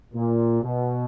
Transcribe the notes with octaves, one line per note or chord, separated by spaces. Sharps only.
A#2
B2